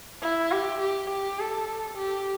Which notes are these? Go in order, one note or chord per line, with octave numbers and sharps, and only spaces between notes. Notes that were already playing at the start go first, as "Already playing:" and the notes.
E4
G4
G4
G4
A4
G4